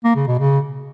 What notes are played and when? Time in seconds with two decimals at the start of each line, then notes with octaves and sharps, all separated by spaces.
0.04 A#3
0.16 C#3
0.27 B2
0.39 C#3